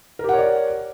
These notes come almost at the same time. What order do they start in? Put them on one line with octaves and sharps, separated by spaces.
A#4 G4 F#5 C#5 D5